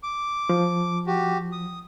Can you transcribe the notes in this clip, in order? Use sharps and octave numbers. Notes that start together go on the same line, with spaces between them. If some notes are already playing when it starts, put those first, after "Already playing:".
D6
F3
F#4 G4
D#6